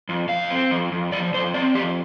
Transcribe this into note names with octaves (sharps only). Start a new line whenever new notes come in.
F2
F2 F5
C4
F2
F2
F3 D5
F2 C5
C4 D5
F2 G4